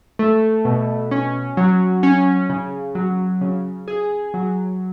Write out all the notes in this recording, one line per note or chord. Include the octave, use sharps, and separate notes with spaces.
A3
B2
C#4
F#3
C#4
C#3
F#3
C#3
G#4
F#3